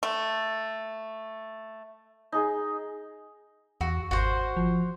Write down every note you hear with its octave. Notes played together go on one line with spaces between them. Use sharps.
A3
D#4 G#4
E2 F#4
G#1 F#4 C5
F3